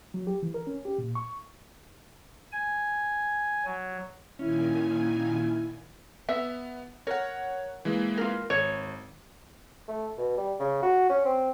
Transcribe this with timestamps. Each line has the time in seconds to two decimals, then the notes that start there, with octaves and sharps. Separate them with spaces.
0.14 F#3
0.27 G4
0.43 E3
0.54 A#4
0.67 C#4
0.85 G4
0.98 A#2
1.15 C#6
2.52 G#5
3.65 F#3
4.39 A#2 D#3 C#4 E4 G#5
6.29 B3 E5
7.07 A#4 C#5 F#5
7.85 E3 G#3 A#3
8.17 F4 A#4
8.50 G#1 C#5
9.88 A3
10.18 B2
10.37 G3
10.60 C#3
10.83 F#4
11.09 C#4
11.25 C4